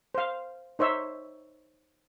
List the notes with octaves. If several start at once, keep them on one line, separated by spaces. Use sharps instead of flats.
C5 F5
D#4 C5 C#5 E5